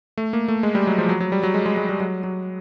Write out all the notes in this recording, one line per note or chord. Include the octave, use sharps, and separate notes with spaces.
A3
A#3
A3
G#3
G3
F#3
F3
F#3
F#3
G3
F#3
G#3
G#3
G#3
G3
F#3
F#3